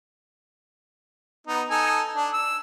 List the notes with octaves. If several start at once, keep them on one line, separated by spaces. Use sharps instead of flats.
B3 D#4
D#4 A4 G#5
D4
E6